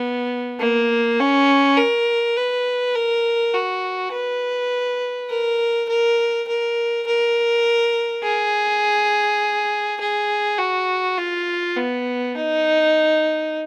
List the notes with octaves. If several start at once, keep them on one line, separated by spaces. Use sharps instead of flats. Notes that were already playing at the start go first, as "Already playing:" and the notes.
Already playing: B3
A#3
C#4
A#4
B4
A#4
F#4
B4
A#4
A#4
A#4
A#4
G#4
G#4
F#4
F4
B3
D#4